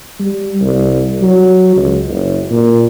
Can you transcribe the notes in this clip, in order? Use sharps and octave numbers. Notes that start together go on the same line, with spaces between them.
G3
C2
F#3
C#2
F#1
A#2